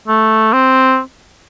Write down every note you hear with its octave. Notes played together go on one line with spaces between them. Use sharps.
A3
C4